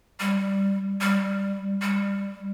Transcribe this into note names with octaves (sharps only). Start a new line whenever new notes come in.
G3
G3
G3